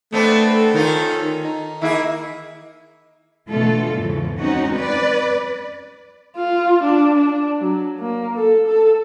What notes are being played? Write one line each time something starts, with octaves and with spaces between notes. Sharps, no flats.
A3 B3 C4 D4 A4
D#3 C#4 F4
D#4
D#3 A#3 E4 G#4 E5
B2 D3 E3 A3 F4 A4
E2 G#2 C#3 E3 F3
G#3 C4 C#4 D#4 F#4
B4 D5
F4
D4
D4
F#3
A#3
A4
A4